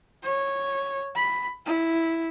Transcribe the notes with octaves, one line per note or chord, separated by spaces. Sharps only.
C#5
B5
E4